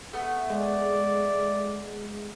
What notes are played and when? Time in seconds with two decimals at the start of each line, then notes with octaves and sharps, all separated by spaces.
0.13 A3 B3
0.50 G#3 D5